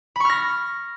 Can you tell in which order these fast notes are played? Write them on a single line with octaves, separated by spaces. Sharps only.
B5 C#6 F6 A#6